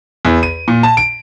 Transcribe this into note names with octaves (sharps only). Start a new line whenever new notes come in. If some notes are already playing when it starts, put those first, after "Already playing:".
E2
D#7
A#2
A5
D7